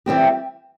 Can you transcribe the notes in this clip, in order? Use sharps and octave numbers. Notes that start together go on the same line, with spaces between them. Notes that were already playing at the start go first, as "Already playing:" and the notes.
E3 G3 C4 G4